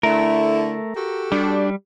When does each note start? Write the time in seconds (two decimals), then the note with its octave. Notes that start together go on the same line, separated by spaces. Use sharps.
0.03 D3 A3 E4 A#4
0.95 F#4 G4 A4
1.32 G3 D4